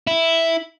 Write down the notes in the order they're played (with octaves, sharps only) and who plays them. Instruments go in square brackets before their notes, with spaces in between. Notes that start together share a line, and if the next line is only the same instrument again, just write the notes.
[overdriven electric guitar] E4